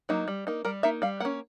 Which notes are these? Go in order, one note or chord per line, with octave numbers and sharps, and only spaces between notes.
F#3 A#3 D#4
G3
A#3 D#4
G3 A#4
A#3 D#4 E5
G3 F5
A#3 C#4 F#5